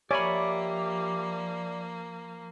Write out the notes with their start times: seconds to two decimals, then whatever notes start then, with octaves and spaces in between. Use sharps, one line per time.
0.11 F3 A#3 G4 C#5 D5 E5 G#5 B5